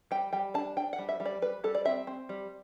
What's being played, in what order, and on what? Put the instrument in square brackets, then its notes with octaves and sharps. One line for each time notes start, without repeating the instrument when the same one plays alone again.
[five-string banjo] G3 G5
G3 G5
D4 A5
D4 G5
F#5
G3
E5
G3
D5
G3 B4
G3 A4
D5
C4 E5
C4
G3